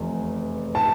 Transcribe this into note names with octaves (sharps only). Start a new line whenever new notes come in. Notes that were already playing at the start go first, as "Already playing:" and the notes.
Already playing: F1 E2
A5